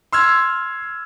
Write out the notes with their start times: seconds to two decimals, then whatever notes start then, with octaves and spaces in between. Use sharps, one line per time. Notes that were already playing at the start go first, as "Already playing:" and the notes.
0.13 C6 E6 F6 G#6